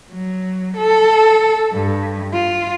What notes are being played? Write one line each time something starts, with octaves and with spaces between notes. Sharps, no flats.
F#3
A4
G2
F4